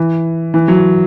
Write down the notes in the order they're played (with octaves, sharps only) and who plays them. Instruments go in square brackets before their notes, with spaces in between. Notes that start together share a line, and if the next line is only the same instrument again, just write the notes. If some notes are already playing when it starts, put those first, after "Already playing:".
Already playing: [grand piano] E3
E3
F#3